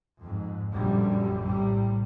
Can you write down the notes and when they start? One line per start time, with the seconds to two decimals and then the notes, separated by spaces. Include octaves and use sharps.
0.21 F2 G#2
0.73 A#1 F#2 D3 G3
1.42 A2 C3 G3